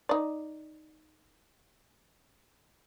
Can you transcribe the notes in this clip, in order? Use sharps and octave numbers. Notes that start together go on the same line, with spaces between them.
D#4 D5